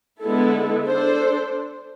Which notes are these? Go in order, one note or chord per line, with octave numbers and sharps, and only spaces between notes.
D3 G#3 B3 E4 A4
D4 A4 C5